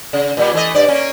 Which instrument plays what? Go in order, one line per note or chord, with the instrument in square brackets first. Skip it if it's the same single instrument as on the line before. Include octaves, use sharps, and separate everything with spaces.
[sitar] C#3
A#2 G3
E3 A3 D#5
G2 D5
A#3 C#4